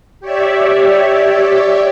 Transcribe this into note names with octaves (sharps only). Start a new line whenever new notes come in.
G4 C#5 D5 E5